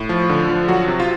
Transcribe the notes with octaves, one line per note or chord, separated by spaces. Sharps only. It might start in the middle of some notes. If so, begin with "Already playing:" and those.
Already playing: A2
F3
D3
F3
F#3 F#4
C3
F4